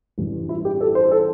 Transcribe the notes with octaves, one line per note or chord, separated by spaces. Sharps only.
A1 G2 E3 G3
E4
G4
A4
C5
A4